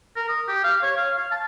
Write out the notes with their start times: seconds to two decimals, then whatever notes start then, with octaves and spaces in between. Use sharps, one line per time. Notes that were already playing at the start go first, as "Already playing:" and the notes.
0.16 A#4
0.29 D#6
0.47 G4
0.64 F5
0.83 C#5
0.96 F5
1.17 F5
1.31 A5